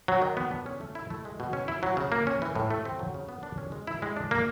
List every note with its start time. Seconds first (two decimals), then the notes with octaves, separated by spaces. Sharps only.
0.08 F#3
0.22 D#3
0.37 B3
0.51 D4
0.66 C#4
0.81 A3
0.95 E4
1.10 A3
1.25 G#3
1.40 B2
1.53 C#4
1.68 E4
1.83 F#3
1.97 C#3
2.12 A#3
2.27 C#4
2.42 E3
2.55 A2
2.71 A3
2.85 C4
2.99 F#3
3.14 C#3
3.29 B3
3.43 D4
3.58 C#4
3.72 G#3
3.87 E4
4.02 G#3
4.16 D4
4.31 A#3